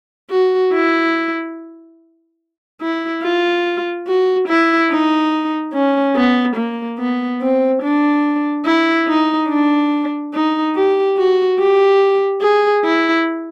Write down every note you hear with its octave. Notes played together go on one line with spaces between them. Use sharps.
F#4
E4
E4
F4
F#4
E4
D#4
C#4
B3
A#3
B3
C4
D4
E4
D#4
D4
D#4
G4
F#4
G4
G#4
E4